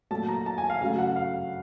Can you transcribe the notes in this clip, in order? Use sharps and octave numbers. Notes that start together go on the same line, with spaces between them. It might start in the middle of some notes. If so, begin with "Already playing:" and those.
A#2 F#3 A3 A5
A#5
A5
G#5
F5
C#3 F#3 A3 F5
F#5
F5